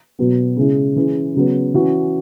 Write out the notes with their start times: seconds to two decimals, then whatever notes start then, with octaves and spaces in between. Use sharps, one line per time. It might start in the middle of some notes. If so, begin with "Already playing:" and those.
0.19 B2 F#3 B3
0.57 C#3 G#3 E4
0.96 E3 C#4 G#4
1.34 C#3 F#3 B3
1.74 E3 C#4 F#4